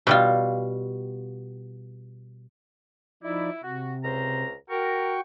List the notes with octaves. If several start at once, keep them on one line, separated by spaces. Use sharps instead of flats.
B2 G3 F4
F3 D#4 E4 D5
C3 F#4
C#2 C5 A#5
F#4 A#4 G5 C#6